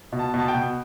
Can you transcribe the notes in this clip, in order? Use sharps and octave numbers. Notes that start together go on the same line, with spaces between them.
B2
A5
B2
A5
G5
B2